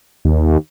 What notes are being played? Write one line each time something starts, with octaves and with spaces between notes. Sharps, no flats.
D#2